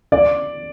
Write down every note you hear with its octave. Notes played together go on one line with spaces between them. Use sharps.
D5